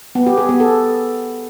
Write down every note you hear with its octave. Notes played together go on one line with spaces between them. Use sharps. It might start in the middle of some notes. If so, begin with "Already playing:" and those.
B3
G4
G#4
B3
A4